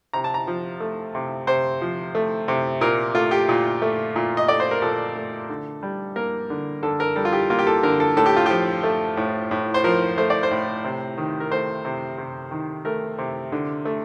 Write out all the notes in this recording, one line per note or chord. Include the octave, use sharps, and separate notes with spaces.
C3 A#5
A5
A#5
F3
A3
C3
C3 C5
F3
A3
C3
A#2 A#4
A3 F4
G4
A#2
A3
A#2
D#5
A3 D5
C5
A#4
A#2 A4
A3
D3
G3
A#3 A#4
D3
D3 A4
A#4
G3 A4
F4
G4
A#3 F4
G4
A4
D3 A#4
A4
A2 A4
G4
F4
F3 G4
A3
A2
A2
C5
F3 A#4
A3 C5
D5
C5
A2
C3
D#3
A#4
A3 C5
C3
C3
D#3
A3 A#4
C3
D3
A3